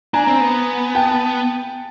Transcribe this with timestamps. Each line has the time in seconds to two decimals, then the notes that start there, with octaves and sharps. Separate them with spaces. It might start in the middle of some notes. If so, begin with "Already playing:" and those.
0.13 D4 G#5 A#5
0.27 C4
0.40 B3
0.95 G5 A5